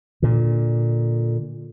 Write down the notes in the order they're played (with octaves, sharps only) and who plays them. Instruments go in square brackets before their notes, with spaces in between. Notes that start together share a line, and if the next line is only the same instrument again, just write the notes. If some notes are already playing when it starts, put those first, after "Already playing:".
[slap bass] A#2 D3